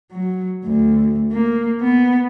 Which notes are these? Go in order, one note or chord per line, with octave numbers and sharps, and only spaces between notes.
F#3
D2
A#3
B3